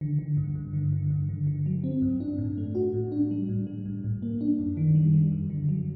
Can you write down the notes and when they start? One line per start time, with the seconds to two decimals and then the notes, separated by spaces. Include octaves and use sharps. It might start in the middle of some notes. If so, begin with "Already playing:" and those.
0.01 D3
0.19 D3
0.37 G2
0.55 G2
0.73 D3
0.93 D3
1.10 G2
1.29 D3
1.47 D3
1.66 F#3
1.84 C4
2.02 G2
2.20 D4
2.38 A2
2.57 A3
2.75 F#4
2.94 A2
3.12 D4
3.31 G3
3.49 A2
3.67 G3
3.86 A2
4.04 A2
4.22 A#3
4.41 D4
4.59 F#2
4.77 D#3
4.95 G3
5.14 G3
5.32 F#2
5.50 D3
5.69 F#3